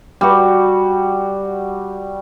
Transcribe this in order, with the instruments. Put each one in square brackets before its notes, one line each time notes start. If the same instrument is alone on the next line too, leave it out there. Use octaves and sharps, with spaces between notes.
[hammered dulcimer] G3 F#4